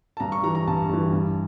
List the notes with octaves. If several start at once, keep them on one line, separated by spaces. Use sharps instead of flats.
A5
G2 A#5
C#6
E3 G3 A#5
A#5
G2 A5
E3 G3
G2